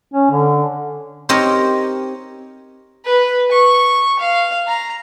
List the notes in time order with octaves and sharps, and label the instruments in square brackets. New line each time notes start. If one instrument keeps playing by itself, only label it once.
[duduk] C#4
D3
[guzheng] C4 D#4 G4 A#4 C#5 D#5
[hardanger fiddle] B4
C#6
F5
A#5